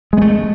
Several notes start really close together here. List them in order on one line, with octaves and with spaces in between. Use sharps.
G#3 B3 A3